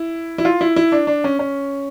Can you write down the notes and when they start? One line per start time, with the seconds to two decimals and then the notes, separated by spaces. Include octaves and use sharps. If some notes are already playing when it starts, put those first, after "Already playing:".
Already playing: E4
0.38 E4
0.45 F4
0.61 E4
0.76 E4
0.92 D4
1.07 D4
1.24 C#4
1.39 C#4